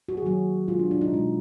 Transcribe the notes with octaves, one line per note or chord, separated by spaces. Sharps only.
F#4
G#4
D#3 F#3 A#3 F#4
B2 G#3 F4
D4
D4
D#4
B2 G#3 F4